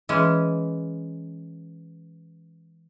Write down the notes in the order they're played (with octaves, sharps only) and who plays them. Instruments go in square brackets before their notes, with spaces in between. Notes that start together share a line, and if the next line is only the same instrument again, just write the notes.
[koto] E3 G#3 C#4